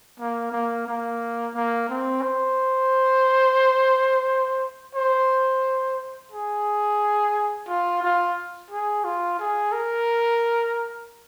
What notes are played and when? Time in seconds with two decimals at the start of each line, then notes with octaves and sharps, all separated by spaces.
0.19 A#3
0.52 A#3
0.87 A#3
1.54 A#3
1.89 C4
2.22 C5
4.95 C5
6.32 G#4
7.68 F4
8.03 F4
8.70 G#4
9.04 F4
9.39 G#4
9.72 A#4